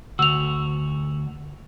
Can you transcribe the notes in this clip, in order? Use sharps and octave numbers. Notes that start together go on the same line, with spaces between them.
D2 F#4 E6 F7